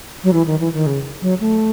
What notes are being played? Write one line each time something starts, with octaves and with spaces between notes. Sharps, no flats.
F#3
E3
D#3
E3
D#3
C#3
F#3
A3